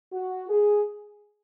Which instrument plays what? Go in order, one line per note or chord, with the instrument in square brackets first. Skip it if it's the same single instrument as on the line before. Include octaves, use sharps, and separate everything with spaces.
[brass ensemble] F#4
G#4